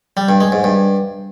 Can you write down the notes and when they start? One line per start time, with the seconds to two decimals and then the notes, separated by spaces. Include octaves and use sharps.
0.17 G3
0.29 G2
0.41 G#3
0.52 G#2
0.64 G2